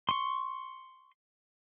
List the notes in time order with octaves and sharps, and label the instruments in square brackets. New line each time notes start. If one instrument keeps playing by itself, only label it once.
[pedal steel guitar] C6 C#6